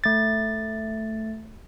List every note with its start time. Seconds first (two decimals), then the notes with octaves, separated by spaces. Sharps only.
0.04 A3 A6